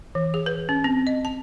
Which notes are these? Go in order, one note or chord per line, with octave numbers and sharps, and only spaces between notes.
E3
G#4
B4
C#4
C4
D#5
A5